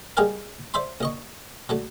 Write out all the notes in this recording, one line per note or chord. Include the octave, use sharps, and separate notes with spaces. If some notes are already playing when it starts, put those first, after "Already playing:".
G3 G#3 G4 G#4 A#4 F5
C5 D5 E5 B5 C6
A#1 D#5 C#6
F#3 A3 D4